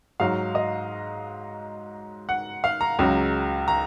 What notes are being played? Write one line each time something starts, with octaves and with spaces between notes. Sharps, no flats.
G#2 F#3 F5
D#5
F#5
F5
A#5
C#2 C#3 F#3
A#5